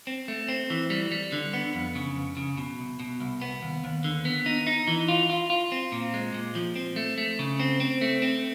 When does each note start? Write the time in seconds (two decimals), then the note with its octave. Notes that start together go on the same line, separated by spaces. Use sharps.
0.07 C4
0.28 A3
0.49 C4
0.70 E3
0.90 G3
1.12 G3
1.32 D3
1.53 B3
1.75 F2
1.95 C#3
2.16 F2
2.37 C#3
2.57 B2
2.79 C2
3.00 B2
3.20 C2
3.42 B3
3.63 D#2
3.84 D#2
4.04 D3
4.25 B3
4.46 D#4
4.67 D#4
4.88 E3
5.08 F4
5.30 F4
5.50 F4
5.72 C4
5.92 A#2
6.14 G#3
6.34 A#2
6.55 F3
6.76 C4
6.96 A3
7.18 A3
7.39 C#3
7.60 C4
7.80 C4
8.01 A3
8.22 C4